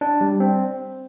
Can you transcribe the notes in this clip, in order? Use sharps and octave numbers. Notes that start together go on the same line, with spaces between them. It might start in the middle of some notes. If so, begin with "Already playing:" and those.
D4
G3
C4